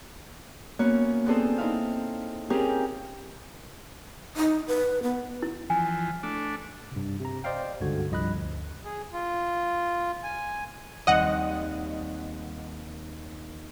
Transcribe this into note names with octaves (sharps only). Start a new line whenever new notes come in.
A#3 B3 C#4 F#4 C#5
B3 C4 D4 G#4 A4 C5
C4 D#4 E4 F5
C4 C#4 F4 G4 G#4 A#4
D#4
B4
B3
E4
E3 F3 G#5
A3 D4
G2 C3
C3 A#5
C5 D5 D#5 F5 G5
C#2 G2 D3 F#4 G#6
C2 G2 F3 D#5 B5 F#6
D2
G#4
F4
G#5
D#2 G3 C4 D#5 F#5